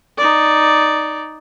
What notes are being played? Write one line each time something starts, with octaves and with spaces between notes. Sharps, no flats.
D#4 D5